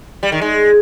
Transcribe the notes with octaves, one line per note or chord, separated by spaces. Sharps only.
G3
D#3
G#3